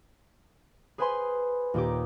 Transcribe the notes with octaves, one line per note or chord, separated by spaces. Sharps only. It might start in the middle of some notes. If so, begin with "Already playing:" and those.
G#4 B4 C5 G#5 B5 C6
D#2 A#2 D#4 G4 D6